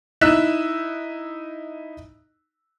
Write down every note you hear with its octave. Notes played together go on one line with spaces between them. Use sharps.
D#4 E4 E6 F#6 B6 E7